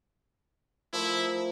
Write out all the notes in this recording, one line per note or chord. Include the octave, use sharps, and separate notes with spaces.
F3 A3 E4 A#4